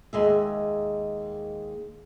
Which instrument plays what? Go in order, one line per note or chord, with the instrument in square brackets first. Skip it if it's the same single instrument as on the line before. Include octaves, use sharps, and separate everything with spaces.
[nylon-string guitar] D#2 G#3 E5